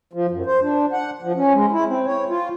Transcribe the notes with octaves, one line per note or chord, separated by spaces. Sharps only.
F3
F#2
C5
D4
F#5
F3
C#4
G#3
E4
C4
C#5
F4